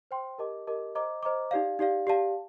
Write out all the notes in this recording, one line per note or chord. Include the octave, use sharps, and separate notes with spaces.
C5 G5 C6
G4 A#4 D#5 A5 D6
G4 A#4 D#5 A5 D6
C5 D#5 A#5 D6
C5 D#5 A#5 D6
D#4 G4 D5 F5
D#4 G4 D5 F5
G4 D5 F5 A5